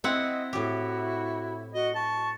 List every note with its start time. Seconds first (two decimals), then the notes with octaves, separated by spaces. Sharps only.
0.04 C4 E4 D#5 F#5
0.53 A2 E4 F#4 G4
1.74 F#4 D#5
1.96 A5 C#6